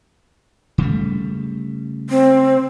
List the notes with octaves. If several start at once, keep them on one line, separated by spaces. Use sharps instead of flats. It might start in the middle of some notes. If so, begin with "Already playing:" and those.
C#3 G3 A3
C4